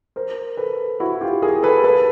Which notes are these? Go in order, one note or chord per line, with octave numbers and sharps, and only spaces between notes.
A#4 C5
A4 B4
E4 F#4
F4 G4
G#4 A#4
A4 B4
A4 B4